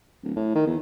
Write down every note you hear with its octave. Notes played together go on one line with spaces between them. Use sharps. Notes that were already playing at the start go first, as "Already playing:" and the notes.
D1
A2
D#3
E2